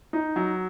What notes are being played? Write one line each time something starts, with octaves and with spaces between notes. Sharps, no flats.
D#4
F#3